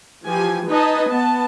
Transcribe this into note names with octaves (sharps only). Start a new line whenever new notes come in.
E3 F3 G4 G#5
D#4 B4 D#5 G#5 A5
B3 A5